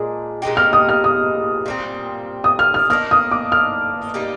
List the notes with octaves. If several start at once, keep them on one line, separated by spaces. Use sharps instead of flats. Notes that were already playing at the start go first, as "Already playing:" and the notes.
Already playing: A#2 G#3 D4 G#4
A#2 G#3 D#4 G4
F6
D#6
F6
D#6
A#2 G3 C4
D#6
F6
F6
D#3 A#3 D4 F6
D#6
D6
F6
G3 A#3 D#4